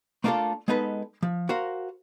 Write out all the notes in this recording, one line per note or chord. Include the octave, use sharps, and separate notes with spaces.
A3 A#3 D4 D#4 F4 A4
G#3 B3 D#4 A4 B4
F3
F#4 A#4 C5 F5